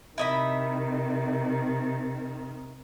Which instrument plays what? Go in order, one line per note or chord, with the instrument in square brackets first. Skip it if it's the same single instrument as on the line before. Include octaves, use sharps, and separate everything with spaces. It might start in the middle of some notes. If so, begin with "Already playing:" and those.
[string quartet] C3 D#3 [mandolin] E4 D#5 B5